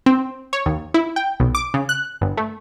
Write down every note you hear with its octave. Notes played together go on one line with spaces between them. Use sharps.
C4
C#5
D#2
E4
G5
B1
D6
C#3
F#6
G1
A3